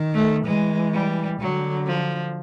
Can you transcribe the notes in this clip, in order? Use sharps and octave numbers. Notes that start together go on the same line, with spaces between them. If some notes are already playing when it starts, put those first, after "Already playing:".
Already playing: D#3
A3
E3 G#3
G3
D3 F#3
F3